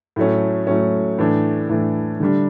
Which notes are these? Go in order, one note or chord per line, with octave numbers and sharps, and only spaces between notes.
A2 F#3 A3 C#4
A2 F#3 A3 C#4
A2 E3 A3 D4
A2 E3 A3 D4
D3 G3 D4